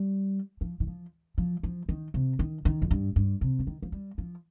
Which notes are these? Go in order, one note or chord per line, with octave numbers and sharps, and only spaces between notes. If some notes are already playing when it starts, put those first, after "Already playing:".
Already playing: G3
F3
D#3
F3
F3
F3
D#3
C3
D#3
D#3
F2
G2
G2
C3
F3
D#3
F3
G3
F3